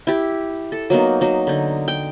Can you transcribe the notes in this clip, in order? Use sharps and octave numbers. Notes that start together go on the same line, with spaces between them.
E4 G4
A4
F#3 A#3 B3 D#4
F#3 D#4
D3 D#4
G5